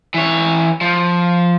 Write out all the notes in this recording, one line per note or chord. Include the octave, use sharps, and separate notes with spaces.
E3 C#5
F3